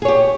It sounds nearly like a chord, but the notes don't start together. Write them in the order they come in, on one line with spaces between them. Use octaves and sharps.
G#4 C#5 G4